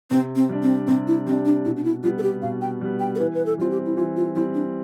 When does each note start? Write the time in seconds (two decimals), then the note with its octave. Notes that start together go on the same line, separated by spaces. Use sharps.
0.10 C3 C4
0.36 C4
0.49 G3 D4
0.63 C4
0.87 C3 C4
1.07 E4
1.26 G3 C4
1.30 D4
1.45 D4
1.65 B2 E4
1.77 D4
1.84 E4
2.03 G3 B3 F4
2.18 A4
2.23 G4
2.42 B2 F5
2.61 G5
2.81 G3 B3
3.00 G5
3.15 A4
3.19 E3 B4
3.34 B4
3.46 A4
3.58 G3 C4 F4
3.70 G4
3.86 E4
3.96 E3 F4
4.17 F4
4.36 G3 C4 E4
4.54 D4